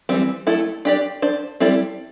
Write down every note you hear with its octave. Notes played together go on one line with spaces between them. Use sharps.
E3 G3 C4
A3 E4 A4
D4 G4 D5
D4 C5
G3 C4 E4 A4 D5